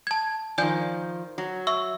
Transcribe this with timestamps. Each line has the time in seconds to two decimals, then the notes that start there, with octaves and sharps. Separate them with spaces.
0.07 A5 G#6
0.58 D#3 F3 D5 G#5 G6
1.38 F#3
1.67 E5 C#6 E6